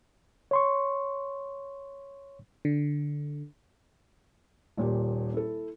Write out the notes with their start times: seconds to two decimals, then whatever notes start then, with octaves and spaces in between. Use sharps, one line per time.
0.51 C#5 C6 C#6
2.65 D3
4.77 D#1 A#2 G4
5.34 E4 A4